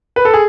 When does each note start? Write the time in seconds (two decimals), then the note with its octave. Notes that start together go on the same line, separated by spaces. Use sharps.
0.16 B4
0.25 A4
0.34 G#4